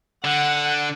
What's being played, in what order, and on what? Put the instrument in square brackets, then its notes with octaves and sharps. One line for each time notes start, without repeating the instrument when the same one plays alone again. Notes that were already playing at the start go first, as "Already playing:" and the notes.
[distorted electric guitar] D3 [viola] F#5